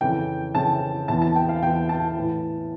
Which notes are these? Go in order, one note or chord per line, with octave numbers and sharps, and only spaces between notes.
F2 C#3 E3 G5
F2 C#3 E3 A5
E2 E3 A5
A5
G5
F5
E2 E3 G5
A5
A2 E3